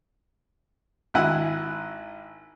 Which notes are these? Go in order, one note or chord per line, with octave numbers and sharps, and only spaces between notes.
G#1 G#2 E4 F#5 G#5